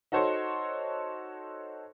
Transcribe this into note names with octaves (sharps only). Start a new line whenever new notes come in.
D#4 F#4 A4 C5 C#5